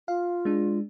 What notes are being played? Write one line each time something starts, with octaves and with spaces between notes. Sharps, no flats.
F4 F5
G#3 D4